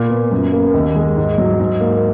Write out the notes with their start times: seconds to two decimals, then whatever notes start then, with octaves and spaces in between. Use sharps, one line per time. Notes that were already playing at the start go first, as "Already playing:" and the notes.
Already playing: A#2
0.10 B3
0.31 F#2
0.53 A#3
0.74 D#2
0.95 G#3
1.17 G#2
1.38 F#3
1.60 G#2
1.80 A#3